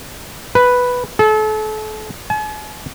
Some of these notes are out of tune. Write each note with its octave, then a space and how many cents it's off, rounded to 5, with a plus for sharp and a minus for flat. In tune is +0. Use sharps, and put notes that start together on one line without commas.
B4 +0
A4 -35
G#5 +45